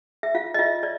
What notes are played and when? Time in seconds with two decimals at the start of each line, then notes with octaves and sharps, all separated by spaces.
0.23 E5
0.35 F4 F5
0.54 D#5
0.59 F4 E5
0.83 C#5 D5